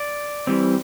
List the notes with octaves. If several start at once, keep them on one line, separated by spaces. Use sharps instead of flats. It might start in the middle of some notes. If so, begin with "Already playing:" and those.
Already playing: D5
E3 G3 C4